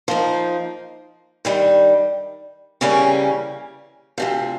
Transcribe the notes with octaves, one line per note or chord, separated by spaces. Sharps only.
F3 A#3 D#4
G2 D#3 G3
C#3 E3 G3 A#3 C#4
D2 C3 F3